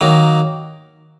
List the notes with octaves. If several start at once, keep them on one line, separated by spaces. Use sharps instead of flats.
D#3 F#3 A#3